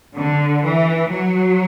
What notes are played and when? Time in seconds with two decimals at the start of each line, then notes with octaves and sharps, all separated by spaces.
0.17 D3
0.64 E3
1.11 F#3